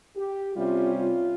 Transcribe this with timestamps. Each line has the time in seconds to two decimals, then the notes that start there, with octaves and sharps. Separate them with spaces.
0.16 G4
0.55 C3 G3 C#4 F4
0.95 F4